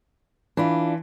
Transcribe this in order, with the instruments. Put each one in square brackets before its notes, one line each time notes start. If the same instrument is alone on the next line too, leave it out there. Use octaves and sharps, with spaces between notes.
[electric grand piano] E3 B5 [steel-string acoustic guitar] D4 F4